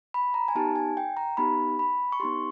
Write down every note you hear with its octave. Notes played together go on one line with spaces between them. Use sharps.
B5
A#5
G#5
B3 D#4 G4 A5
G#5
G5
A#5
B3 D#4 G4 B5
B5
C#6
B3 D#4 G4 C6